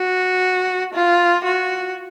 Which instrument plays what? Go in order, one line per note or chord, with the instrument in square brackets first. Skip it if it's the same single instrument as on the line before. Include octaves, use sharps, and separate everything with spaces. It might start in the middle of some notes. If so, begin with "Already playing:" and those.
Already playing: [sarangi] F#4
F4
F#4